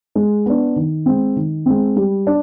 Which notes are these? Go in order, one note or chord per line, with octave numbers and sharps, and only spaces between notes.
G#3
B3 D4
D#3
G#3 C4
D#3
G#3 C4
G3
D4